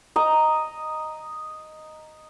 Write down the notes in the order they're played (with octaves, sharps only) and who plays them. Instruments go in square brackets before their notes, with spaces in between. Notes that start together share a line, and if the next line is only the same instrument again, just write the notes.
[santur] D#5 A#5